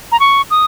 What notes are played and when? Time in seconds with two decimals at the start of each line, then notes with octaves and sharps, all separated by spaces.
0.12 A#5
0.20 C#6
0.50 D#6